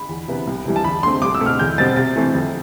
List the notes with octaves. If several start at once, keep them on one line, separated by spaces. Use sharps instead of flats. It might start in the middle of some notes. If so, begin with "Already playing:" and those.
Already playing: B5
E2
C3 E3 B3
C2
C3 E3 G3
A5
E2 B5
D3 A3 C4 C6
C2 D6
E6
B2 A3 C4
F6
E2 G6
B2 G3 C4 A6
C3 A6
E3 A3 C4
F2